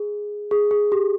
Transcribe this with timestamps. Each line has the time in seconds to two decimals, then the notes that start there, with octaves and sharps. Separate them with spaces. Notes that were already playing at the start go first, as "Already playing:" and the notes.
Already playing: G#4
0.51 G#4
0.71 G#4
0.92 G4